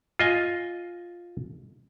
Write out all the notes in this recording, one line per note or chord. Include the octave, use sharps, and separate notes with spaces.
F4 D#5 G#5